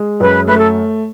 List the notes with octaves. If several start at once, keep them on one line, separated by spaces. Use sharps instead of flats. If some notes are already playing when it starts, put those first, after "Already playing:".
Already playing: G#3
F#2 B4
A3 B4
A4